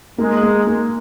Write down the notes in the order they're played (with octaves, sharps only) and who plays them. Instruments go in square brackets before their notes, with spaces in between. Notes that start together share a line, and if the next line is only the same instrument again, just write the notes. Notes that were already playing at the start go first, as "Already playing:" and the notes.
[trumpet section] G#3 [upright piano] A#3
[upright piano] A#3
A#3